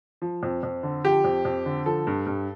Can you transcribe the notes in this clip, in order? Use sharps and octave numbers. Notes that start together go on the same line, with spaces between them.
F3
F2
F2
D3
F3 G4
F2
F2
D3
F3 A4
G2
G2